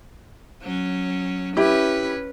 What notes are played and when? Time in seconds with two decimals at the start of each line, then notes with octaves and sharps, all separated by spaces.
0.62 F#3 C#4
1.57 C#4 E4 G4 B4